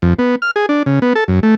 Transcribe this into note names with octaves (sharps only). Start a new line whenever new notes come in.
F2
B3
F6
G#4
D4
C#3
B3
A4
F#2
A3